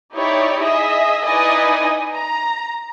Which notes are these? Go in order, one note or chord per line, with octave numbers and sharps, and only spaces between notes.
D#4 E4 G4 C#5 D5
G#4 D#5 E5
D#4 E4 B4 D5 D#5 G#5
A#5